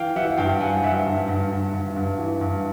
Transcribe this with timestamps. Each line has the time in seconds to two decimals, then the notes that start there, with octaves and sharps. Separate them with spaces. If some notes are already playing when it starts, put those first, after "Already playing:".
Already playing: E3 F5 G5
0.16 E3 E5 F#5
0.37 G2 F5 G5
0.60 G3 F#5 G#5
0.83 G2 E5 F#5
1.06 G2
1.28 G2
1.51 G2
1.73 G2
1.96 G2
2.19 E3
2.41 G2